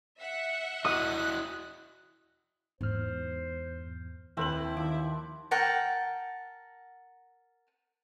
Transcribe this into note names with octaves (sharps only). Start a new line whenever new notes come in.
E5 F#5
E4 F#4 D#5 D#6 F#6
E2 G#2 D#4 C5 F6
D#2 C4 E4 B4 G5 E6 F#7
D#3 F3 D6
A#4 F#5 G5 A5